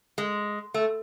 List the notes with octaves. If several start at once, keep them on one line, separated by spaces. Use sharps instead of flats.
G#3
A3